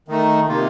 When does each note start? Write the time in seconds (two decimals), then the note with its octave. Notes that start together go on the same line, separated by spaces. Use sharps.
0.08 D#3 A3 D#4
0.48 C3 D#3 A#3 F4